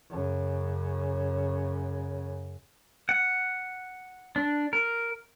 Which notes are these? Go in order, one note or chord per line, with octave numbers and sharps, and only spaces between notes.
F#2 C#3
F#5
D4
A#4